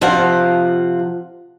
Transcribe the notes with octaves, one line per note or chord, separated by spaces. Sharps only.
C3 F3 F4 F5 F#5